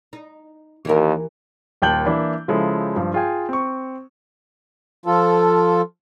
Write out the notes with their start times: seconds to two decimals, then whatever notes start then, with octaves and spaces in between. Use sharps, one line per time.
0.13 D#4
0.85 D#2 E3 G4 A#4
1.82 D#1 D#2 G5 A5 G6 F#7
2.06 E3 A#3 D4 E4
2.48 C#3 F3 G#3 E4 A4
2.96 G2 F3
3.14 F4 G#4 G5 G#5
3.49 C4 C#6
5.06 F3 F4 A4